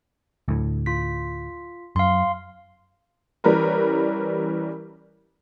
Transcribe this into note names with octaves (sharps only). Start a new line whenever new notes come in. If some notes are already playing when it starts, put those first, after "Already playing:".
D2 A2
F4 B6
F#2 F5 C6
E3 G3 C#4 A#4 B4